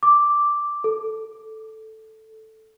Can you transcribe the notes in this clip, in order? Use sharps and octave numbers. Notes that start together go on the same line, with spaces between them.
D6
A4